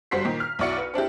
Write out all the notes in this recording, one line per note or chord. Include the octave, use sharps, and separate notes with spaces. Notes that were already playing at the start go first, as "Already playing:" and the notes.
G1 G3 F#4 C5 B6 C7
A#2 D#3
F6
B1 E4 F#4 D5 C#6 C#7
B4
C4 D4 E4 G4